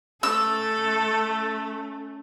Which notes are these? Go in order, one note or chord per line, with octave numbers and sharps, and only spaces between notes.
A3 C#4 A4 E6